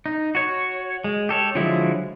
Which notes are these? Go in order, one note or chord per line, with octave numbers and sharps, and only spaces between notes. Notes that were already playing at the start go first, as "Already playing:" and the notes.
D#4
F#4 C#5
G#3
G4 A4 C#5
D3 F3 F#3 G#3 E4